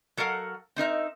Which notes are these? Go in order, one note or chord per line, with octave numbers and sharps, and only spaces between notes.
F#3 A4 A#4 F5 F#5
C4 D#4 A#4 E5